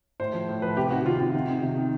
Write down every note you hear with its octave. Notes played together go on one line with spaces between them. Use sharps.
A2 C5
F3
A2
F3 B4
C3 G4
D#3 F#4
C3 F4
D#3 F4
C3
D#3
C3
D#3